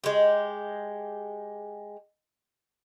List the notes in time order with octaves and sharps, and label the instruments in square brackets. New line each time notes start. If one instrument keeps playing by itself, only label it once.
[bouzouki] G#3 G4